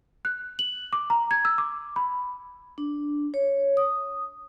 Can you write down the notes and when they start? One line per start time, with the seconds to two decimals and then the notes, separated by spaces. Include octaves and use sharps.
0.25 F#6
0.59 F#7
0.93 D6
1.10 A#5
1.31 G#6
1.45 E6
1.58 D6
1.96 B5
2.78 D4
3.34 C#5
3.77 D#6